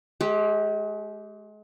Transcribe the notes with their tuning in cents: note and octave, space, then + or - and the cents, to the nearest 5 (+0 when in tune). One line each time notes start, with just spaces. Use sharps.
G#3 +35 G4 +0